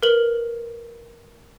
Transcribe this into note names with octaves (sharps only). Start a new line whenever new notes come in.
A#4 B4 F#7